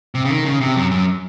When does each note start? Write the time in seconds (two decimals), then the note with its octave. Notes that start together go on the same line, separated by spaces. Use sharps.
0.15 C3
0.25 C#3
0.30 D#3
0.45 C#3
0.61 C3
0.76 F#2
0.91 F#2